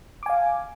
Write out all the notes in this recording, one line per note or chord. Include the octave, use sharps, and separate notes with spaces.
F5 G#5 D6